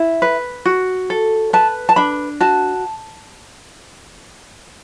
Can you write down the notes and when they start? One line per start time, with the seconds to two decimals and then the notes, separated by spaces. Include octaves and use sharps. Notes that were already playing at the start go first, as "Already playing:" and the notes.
Already playing: E4
0.22 B4
0.65 F#4
1.10 A4
1.53 B4 A5
1.89 A5
1.96 D4 B5
2.40 F#4 A5